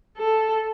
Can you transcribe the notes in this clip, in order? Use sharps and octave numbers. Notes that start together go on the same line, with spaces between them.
A4